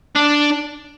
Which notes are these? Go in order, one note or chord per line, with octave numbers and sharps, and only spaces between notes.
D4